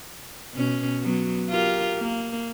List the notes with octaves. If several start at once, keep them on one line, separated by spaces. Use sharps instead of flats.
B2 C#4
F#3 B3
F4 G4 A#4
A#3